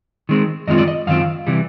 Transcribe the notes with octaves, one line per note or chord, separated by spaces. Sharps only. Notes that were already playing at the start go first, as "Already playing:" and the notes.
D#3 G#3 C4
F#2 D#3 G#3 C4 F4 D#5
D5
D#5
F#2 D#3 C4 F4 F5
C3 E3 G3